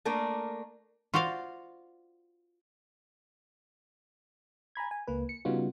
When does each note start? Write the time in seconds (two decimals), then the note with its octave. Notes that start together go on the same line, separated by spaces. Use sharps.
0.05 A3 A#3 D4 A#4
1.14 F4 F#4 C5 D5 F5
4.75 G#5 A#5 B5 G#6
4.91 G#5
5.07 C#2 A#3 B4
5.29 C#7
5.45 C#3 G3 B3 D#4 F4 F#4